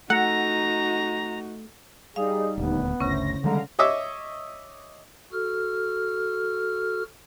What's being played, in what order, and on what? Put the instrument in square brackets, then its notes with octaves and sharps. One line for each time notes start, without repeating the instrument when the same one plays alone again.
[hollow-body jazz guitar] A3 [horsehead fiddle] D#4 F#4 [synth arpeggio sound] F#5 [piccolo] A#5
[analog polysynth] G3 D#4 [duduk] G#4 [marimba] F5
[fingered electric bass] D#1 D2 [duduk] B3
[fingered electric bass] G1 D2 [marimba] C#3 C#4 [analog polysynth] E4 C5 A#6
[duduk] D3 [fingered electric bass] D#3 G3 G#3 [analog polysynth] F5 A#5
[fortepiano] C#5 D#5 E5 D6 E6
[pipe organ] F#4 A4 F6